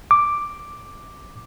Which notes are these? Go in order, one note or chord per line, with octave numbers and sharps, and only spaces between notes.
D6